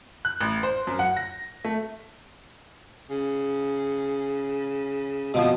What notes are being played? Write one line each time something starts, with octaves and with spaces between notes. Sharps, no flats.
F#6
A1
C5
F#2
F#5
A#6
A3
C#3
B2 F3 C4